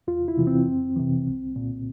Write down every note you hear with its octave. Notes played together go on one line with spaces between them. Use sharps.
E2 F4
E4
C3 E3
C4
F2
C3 E3
C2
A#2